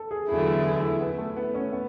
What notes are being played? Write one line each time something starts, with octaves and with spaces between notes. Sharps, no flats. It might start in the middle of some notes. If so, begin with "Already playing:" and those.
Already playing: A4
G#4
E2 D3 F#3 A3 E4 G#4
G#4
E4
B3
A3
B3
C#4
B3